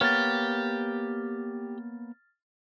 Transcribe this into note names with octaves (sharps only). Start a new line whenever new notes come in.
A#3 B3 G4 C#5 F6 A6